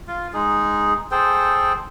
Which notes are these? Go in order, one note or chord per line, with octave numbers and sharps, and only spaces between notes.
F4
G#3 D#4 G#4
G#4 A4 C5 G5